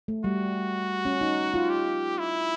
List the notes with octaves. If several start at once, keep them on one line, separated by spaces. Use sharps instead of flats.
A3
G3 F#4
C#4
D#4
F4
G4
E4